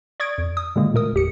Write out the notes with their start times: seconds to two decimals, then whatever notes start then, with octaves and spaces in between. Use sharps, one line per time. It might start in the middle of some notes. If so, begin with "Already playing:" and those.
0.20 D5 C#6 D#6 G#6 D7
0.38 F2
0.57 D#6
0.76 A#2 D3 D#3 G#3 A#3
0.94 A#2 A3 A#4 D#6
1.13 G1 E2 G4 C#7